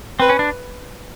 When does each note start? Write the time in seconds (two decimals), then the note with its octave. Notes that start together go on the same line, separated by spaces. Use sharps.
0.20 C4 B4
0.29 C#4
0.39 D4